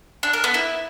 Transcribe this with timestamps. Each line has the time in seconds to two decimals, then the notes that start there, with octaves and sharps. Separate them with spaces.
0.23 D4
0.33 A#4
0.44 B3
0.54 E4